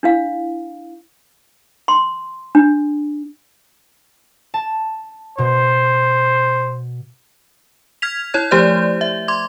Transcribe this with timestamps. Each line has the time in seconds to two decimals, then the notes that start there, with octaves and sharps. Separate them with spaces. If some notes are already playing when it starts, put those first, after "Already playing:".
0.03 D4 E4 F5
1.88 C6
2.55 D4
4.54 A5
5.38 B2 C5
8.02 F6 G#6 B6 F7
8.34 E4 C#5 G#6
8.51 F3 A3 G4 C5 D5 G6
9.01 E5
9.28 C6 D6 G#6